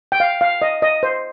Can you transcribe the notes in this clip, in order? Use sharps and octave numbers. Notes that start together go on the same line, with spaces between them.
G5
F5
F5
D#5
D#5
C5